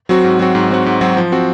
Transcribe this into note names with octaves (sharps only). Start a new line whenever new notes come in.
F#3 C4 F#4
G#2
F#3 C4 F#4
G#2
F#3 C4 F#4
G#2
F#3 C4 F#4
F3
C4 F#4